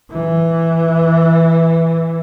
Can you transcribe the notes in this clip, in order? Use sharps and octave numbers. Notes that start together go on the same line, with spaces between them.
E3